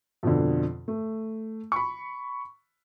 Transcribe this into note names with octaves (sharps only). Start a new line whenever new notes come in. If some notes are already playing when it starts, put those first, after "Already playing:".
F2 B2 D3
A3
B5 C#6